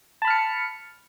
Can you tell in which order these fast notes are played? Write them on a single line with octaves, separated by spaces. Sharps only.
A5 B5 F6 C#7